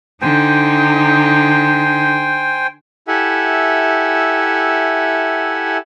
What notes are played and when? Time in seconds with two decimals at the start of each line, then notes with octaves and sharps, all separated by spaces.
0.21 D3 D#4 C5 G5 G#5
3.08 E4 G4 A4 E5 F#5 G#5